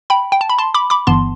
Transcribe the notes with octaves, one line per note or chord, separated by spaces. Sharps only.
G5 B5
G5
A5
B5
A5 C6
B5 D6
B5 D6
G1 G2 E3 B3 A5 C6